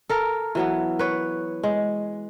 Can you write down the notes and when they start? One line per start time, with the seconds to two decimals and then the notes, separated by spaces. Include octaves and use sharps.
0.09 A4 A#4
0.55 E3 F#3 B3
0.99 B4 C#5
1.63 G#3